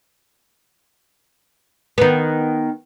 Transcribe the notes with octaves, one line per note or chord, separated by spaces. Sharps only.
D#3 B3